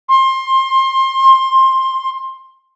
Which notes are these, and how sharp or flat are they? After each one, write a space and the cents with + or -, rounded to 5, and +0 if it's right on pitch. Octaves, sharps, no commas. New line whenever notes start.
C6 +20